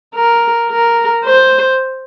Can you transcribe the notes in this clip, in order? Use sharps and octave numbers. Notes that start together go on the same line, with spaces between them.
A#4
A#4
C5